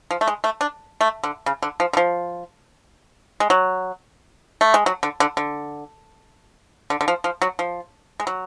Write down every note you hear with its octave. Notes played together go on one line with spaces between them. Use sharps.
F3
A3
G#3
A3
D4
A3
D3
C#3
D3
F3
D3
F3
G#3
F#3
A3
G#3
F#3
D3
D3
D3
D3
D3
F3
F3
F#3
F3
G#3
F#3